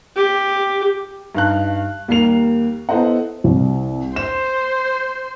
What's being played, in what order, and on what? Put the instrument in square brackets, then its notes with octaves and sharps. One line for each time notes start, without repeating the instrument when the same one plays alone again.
[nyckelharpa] G4
[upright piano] G2 D#4 F5 A5 F#6
D#2 G3 A#3 C7 F7
B3 E4 A4 C5 D#5 F#5
[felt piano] C2
[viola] C5 [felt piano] E7